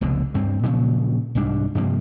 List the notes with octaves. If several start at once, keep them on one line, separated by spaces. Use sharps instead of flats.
F1 C#2 B2 D3
D2 G2 C4
A#2 C#3 F3 F#3
C2 G#2 G3 D4
G2 C3 F3 A#3